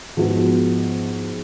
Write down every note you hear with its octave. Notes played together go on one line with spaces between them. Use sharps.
G#2 F3 B3 F#4